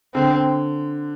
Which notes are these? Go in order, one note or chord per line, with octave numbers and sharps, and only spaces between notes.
D3 C4